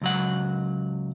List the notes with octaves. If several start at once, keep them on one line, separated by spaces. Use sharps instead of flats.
C#2 F#3 F#5